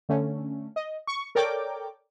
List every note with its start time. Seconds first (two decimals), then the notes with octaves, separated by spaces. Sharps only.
0.09 D3 A3 C#4
0.76 D#5
1.07 C#6
1.35 A4 A#4 C#5 D5 G5 D6